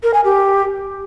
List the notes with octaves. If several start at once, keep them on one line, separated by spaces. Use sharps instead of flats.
A#4
G#5
G4